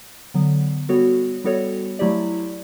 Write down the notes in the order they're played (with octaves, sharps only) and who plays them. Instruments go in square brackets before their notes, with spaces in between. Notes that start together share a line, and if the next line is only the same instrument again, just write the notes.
[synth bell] D3 F#3 B3
G3 B3 F#4 A4 C#5
G3 B3 F#4 A4 C#5
F#3 A3 E4 G4 D5